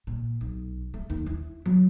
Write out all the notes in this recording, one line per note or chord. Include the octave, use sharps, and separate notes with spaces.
A#2
B1
A3
D#2
E4
F#3